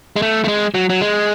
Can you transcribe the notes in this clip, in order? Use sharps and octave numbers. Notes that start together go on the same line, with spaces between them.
G#3
A3
A3
G#3
F#3
F#3
G#3